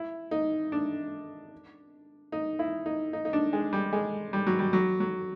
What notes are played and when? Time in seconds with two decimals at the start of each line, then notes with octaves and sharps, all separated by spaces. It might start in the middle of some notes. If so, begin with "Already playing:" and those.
Already playing: E4
0.31 D#4
0.72 D4
2.32 D#4
2.59 E4
2.86 D#4
3.13 D#4
3.25 D#4
3.33 D4
3.53 G#3
3.73 G3
3.93 G#3
4.33 G3
4.47 F#3
4.59 G3
4.73 F#3
5.00 F#3